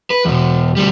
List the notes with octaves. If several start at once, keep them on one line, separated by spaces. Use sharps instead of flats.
B4
E2 B2
D2 G3